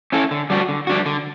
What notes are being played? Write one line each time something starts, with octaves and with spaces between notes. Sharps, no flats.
C#4 E4 A4
D3
G3 D4 F#4
D3
G3 D4 F#4
D3